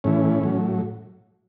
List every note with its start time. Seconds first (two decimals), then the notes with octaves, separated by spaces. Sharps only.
0.04 A2 E3 C#4
0.43 A2 F#3